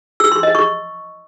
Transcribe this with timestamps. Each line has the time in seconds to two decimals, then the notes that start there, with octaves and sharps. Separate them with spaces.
0.20 E6
0.32 C6
0.43 D#5
0.55 C#6